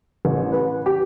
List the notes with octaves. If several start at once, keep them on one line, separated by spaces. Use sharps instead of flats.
A1
B4
G4